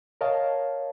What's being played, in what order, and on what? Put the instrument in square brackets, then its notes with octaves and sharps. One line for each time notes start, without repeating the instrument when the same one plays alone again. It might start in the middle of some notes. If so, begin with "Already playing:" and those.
[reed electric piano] A#4 C#5 D#5 F5 A5